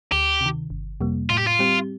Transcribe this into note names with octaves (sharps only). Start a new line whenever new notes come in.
D2 G4
C3 D#3
G1
F2 C3 G3 A#3
A2 F4
G4
F4
G3 C4 G4